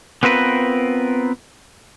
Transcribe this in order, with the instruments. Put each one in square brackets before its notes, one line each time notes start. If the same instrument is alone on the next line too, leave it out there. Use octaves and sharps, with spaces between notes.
[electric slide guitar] B3 C4 F4 A#4 B4